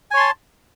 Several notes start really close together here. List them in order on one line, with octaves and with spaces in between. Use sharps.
G#5 C#5 C6 A5